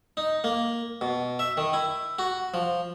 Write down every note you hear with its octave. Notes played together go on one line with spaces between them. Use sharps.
D#4
A#3
B2
E5
D#3
E4
F#4
F3